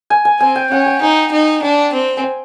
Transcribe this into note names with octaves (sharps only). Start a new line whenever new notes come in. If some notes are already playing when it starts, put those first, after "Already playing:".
G#5
G#5
C4 G#5
G5
C#4 F#5
G5
D#4 G#5
D#4
D4 G5
C4
G#5
G5